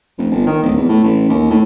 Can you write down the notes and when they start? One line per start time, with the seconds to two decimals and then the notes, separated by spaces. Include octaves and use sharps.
0.18 F1
0.31 G1
0.47 D#3
0.62 D1
0.77 E2
0.89 A2
1.04 A1
1.29 D#2
1.50 A2